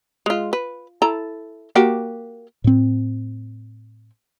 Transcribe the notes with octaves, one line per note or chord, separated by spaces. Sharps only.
G#3 F4
B4
E4 A4 A#5
A#3 F#4 G4
A2 C4